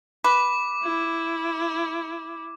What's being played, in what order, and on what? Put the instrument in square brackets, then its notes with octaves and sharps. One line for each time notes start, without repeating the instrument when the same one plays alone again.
[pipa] B4 [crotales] D6
[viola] E4